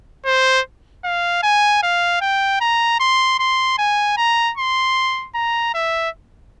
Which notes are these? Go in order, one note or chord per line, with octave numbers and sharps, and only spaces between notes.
C5
F5
G#5
F5
G5
A#5
C6
C6
G#5
A#5
C6
A#5
E5